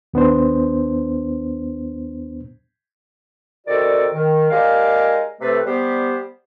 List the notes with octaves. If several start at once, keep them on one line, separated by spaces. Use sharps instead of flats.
D#2 B3 D4 C5
C3 D#3 F#4 A4 D5
D#3
G#3 D#4 G4 A#4 D5 F5
C3 A3 A4 B4
G3 B3 G4 C5